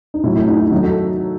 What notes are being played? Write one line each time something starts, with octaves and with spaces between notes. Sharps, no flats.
D#4
A2 F#3 A3 E4
E4
D#4
E4
D#3 F#3 A3 D#4 F#4
F#4 A4